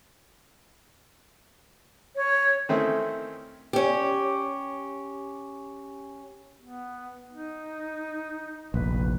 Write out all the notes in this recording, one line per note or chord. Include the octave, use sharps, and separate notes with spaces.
C#5
D#3 A3 C4 C#4 E4
C#4 G4
B3
D#4
F1 A#1 B4